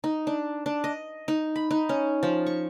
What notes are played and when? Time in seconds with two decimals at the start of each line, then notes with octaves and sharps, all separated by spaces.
0.04 D#4
0.27 D4
0.66 D4
0.84 D#5
1.28 D#4
1.56 B5
1.71 D#4
1.89 C#4
2.23 F3
2.46 C#6